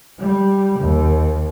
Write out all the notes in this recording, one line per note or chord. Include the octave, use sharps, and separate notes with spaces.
G3
D#2